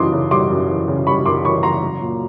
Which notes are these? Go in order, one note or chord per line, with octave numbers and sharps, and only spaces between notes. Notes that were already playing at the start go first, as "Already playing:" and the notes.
Already playing: F#2 C#3 E3 G3 C6 D6 D#6
C#3
G3 C6 D6
F#2
E3
C#3
G3 B5 C#6
F#2 C6 D6
E3 B5 C#6
C#3 A#5 C6
F#3
A#2